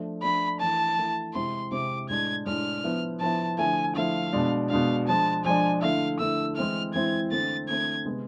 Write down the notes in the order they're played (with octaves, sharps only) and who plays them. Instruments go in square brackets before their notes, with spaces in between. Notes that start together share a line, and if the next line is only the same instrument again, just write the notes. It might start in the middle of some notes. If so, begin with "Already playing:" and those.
Already playing: [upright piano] F3 A3 D4
[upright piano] F3 A3 D4 [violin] B5
[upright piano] E3 A3 E4 [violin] A5
[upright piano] E3 A3 E4
[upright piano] C3 G#3 C4 E4 [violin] C6
[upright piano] C3 G#3 C4 E4 [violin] D6
[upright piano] A2 G#3 D4 [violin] G#6
[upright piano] A2 G#3 D4 [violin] F6
[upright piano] F3 B3 E4
[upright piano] F3 B3 E4 [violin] A5
[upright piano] D3 F3 A3 E4 [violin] G#5
[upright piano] D3 F3 A3 E4 [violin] F5
[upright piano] B2 G#3 D4
[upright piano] B2 G#3 D4 [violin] F5
[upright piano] F3 G#3 D4 [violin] A5
[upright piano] F3 G#3 D4 [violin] G#5
[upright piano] D3 A3 E4 [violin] F5
[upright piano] D3 A3 E4 [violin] E6
[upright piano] E3 G#3 C4 E4 [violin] F6
[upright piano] E3 G#3 C4 E4 [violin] G#6
[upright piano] D3 A3 C4 [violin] A6
[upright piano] D3 A3 C4 [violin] G#6
[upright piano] C3 G#3 B3